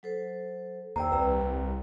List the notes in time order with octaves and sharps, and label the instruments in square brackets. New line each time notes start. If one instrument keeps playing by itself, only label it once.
[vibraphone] F#3 A4 C5
[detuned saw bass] D#2 [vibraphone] C5 D5 E6 [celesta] G5 A#5
[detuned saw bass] C2 [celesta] B4 G5 [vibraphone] A#5